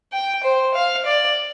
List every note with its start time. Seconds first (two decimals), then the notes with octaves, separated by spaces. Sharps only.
0.13 G5
0.43 C5
0.74 F5
1.05 D5